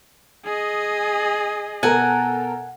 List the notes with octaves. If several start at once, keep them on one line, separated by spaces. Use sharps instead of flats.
G#4 D#5
B2 A4 A#4 F#5 G#5